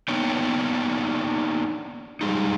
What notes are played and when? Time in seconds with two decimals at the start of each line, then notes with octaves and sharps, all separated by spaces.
0.08 A#3 B3 D4 D#4 C#5 G5
2.21 G3 G#3 D#4